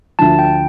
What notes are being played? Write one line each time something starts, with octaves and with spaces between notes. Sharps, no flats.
D2 D3 F3 A5
G5